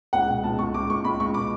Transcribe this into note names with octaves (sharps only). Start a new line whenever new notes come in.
C#2 F#5
B2
C#2 A5
C#2 C#6
C#2 D6
C#2 C#6
C#2 B5
C#2 C#6
B2 D6